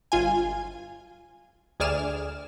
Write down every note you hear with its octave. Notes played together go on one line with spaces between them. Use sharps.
G1 F4 G#5
D2 G#4 D5 F6 E7